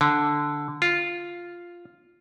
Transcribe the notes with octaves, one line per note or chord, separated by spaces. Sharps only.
D3
F4